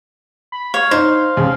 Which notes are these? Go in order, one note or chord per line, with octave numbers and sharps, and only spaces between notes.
B5
C#5 F5
D#4 C5
D#2 C#3